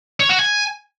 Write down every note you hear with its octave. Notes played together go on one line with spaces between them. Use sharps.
C#5
F#4
G#5